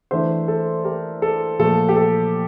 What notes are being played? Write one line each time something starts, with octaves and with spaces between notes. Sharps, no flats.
E3 A3 D4 C5 E5
A4
G4 A#4
A4
A#2 F3 A3 A4
G4
A4